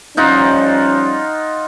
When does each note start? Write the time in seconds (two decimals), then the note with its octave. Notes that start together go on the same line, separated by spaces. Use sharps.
0.17 F3 G3 C#4 D#4 F4 F#5